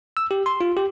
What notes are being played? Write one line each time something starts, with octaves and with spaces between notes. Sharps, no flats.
E6
G4
C6
F4
G4